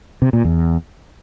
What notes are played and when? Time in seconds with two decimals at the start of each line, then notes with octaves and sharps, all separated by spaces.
0.22 C3
0.33 A#2
0.44 E2